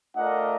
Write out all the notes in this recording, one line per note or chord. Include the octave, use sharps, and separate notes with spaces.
A3 D4 F4 A#4 D#5 F#5